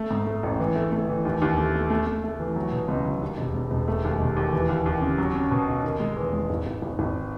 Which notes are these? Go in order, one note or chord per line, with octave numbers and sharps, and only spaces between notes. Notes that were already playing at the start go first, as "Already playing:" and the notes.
Already playing: A3
G#2
A3
A1
E3
A3
A3
E3
D#2
D#2
A3
A3
A3
A3
A3
E3
F#3
B2
C#2
F#3
D#2
E1
E1
E1
A3
D#2
E1
D#2
E3
D#2
D#2
C#3
F#3
C#4
B2
B1
D#3
G#3
E2
G#3
G#1
G#1
G#1
G#1